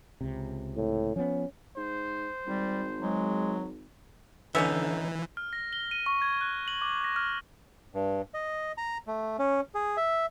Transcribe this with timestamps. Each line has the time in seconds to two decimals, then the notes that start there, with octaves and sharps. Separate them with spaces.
0.21 C#2 C3
0.77 A2
1.16 F3 B3 C#4
1.77 G#2 C5
2.47 G#1 G3
3.01 F#3 G#3
4.55 D3 E3 B3 C#4 D#4 E5
5.37 F6
5.53 A#6
5.73 G7
5.91 D#7
6.06 C#6
6.21 G#6
6.41 F#6
6.68 F#7
6.82 D6
7.04 A#6
7.16 F6
7.94 G2
8.34 D#5
8.78 A#5
9.07 A3
9.39 C#4
9.75 G#4
9.97 E5